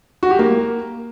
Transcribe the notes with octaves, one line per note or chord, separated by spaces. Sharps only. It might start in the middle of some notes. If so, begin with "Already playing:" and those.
F#4
G4
A#3